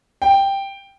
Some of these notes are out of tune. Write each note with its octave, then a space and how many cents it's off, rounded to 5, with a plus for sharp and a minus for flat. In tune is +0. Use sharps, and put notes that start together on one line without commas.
G5 +5